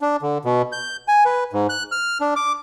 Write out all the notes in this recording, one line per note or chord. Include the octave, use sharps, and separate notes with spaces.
D4
D3
B2
G6
G#5
B4
G#2
F#6
F6
D4
D6